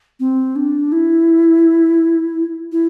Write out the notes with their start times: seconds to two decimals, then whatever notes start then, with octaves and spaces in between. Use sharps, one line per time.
0.20 C4
0.56 D4
0.92 E4
2.72 E4